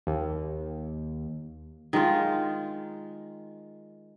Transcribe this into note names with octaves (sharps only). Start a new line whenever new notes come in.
D#2
D#3 G#3 F4